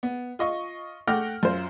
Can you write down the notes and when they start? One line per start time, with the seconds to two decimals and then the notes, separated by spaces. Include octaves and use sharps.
0.03 B3
0.39 F4 D#5 C#6
1.07 A3 F#5 G5 D6 F6 A#6
1.43 F#2 F4 C5